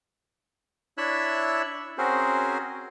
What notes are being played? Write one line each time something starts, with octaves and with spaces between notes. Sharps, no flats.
D4 E4 C#5 E5 E6 F#6
C4 C#4 F#4 G#4 A#4 C5